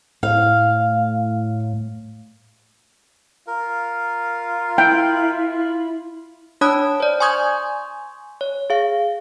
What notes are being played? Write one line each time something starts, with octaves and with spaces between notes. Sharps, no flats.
A2 F5
F4 A#4
E4 G5
D4 C#5 A5 B5 D#6 F#6
C5 D5
G#5 C6 C#6 D#6 G6 G#6
C#5
G#4 F5